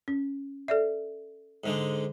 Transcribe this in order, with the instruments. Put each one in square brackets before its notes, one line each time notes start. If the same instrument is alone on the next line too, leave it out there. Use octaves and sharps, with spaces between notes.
[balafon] C#4
A4 D5 E5
[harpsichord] G#2 D3 G#3